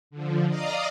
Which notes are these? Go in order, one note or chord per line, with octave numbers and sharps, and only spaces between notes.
D3 F3
D5 D#5 F5 A#5 D#6